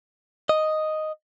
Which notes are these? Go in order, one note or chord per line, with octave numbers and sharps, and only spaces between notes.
D#5